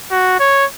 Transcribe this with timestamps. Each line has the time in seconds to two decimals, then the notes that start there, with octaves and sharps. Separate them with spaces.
0.12 F#4
0.40 C#5